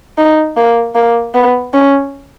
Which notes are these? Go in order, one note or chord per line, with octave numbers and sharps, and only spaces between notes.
D#4
A#3
A#3
B3
C#4